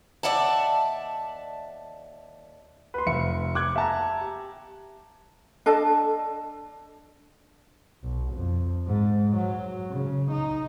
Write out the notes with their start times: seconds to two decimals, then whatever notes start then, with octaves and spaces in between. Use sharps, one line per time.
0.23 D#2 D#3 D5 E5 F#5 A5
2.94 B4 C6
3.06 F1 E5 C#7
3.55 D6 F#6 G#6
3.76 E5 A5 A#5
4.21 G4
5.66 D4 A4 D#5 A5
8.03 B1
8.33 F2
8.87 G#2
9.36 F#3
9.91 C#3
10.32 D#4